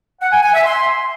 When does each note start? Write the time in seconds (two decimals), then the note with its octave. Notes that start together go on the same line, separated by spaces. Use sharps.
0.20 F#5
0.31 G#5
0.42 G#5
0.53 E5
0.64 C6